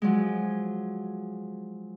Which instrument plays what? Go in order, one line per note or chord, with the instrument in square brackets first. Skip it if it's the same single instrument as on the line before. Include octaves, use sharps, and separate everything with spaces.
[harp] F3 F#3 G#3